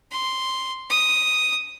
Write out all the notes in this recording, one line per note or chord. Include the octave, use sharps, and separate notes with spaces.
C6
D#6